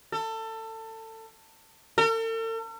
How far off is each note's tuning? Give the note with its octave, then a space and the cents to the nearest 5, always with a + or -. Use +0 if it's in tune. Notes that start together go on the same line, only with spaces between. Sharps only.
A4 +25
A4 +45